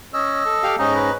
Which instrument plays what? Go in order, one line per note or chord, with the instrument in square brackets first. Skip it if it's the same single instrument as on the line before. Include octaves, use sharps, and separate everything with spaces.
[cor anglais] C#4 [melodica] D#5 E6
[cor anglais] A4
[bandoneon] G4 F5
[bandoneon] G#2 C#4 [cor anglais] D#4 [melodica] D#5 A#5
[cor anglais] B4